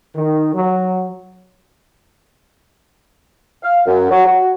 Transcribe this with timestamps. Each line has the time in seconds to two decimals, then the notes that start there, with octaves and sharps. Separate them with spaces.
0.15 D#3
0.54 F#3
3.63 F5
3.86 F#2
4.11 F#3
4.26 F#4